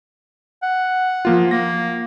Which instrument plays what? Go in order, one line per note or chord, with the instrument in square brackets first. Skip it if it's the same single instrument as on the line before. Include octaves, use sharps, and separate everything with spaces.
[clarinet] F#5
[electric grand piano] F3 A#3 F4
[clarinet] A#3 [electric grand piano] A#6